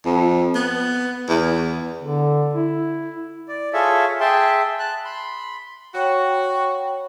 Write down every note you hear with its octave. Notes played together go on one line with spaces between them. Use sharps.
F2
B3
E2
D3
E4
D5
F4 G#4 A4 C#5 E5
G#4 E5 G5 A5 C6
A5 F#6
B5 C6
F#4 C#5 G5 B5